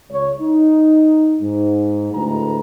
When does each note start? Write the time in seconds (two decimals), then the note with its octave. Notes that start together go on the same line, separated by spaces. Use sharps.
0.10 C#2 C#5
0.41 D#4
1.41 G#2
2.13 D2 A2 G#3 B4 A#5